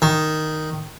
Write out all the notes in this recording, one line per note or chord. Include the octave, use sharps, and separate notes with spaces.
D#3